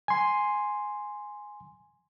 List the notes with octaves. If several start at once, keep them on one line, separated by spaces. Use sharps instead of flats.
G#5 C6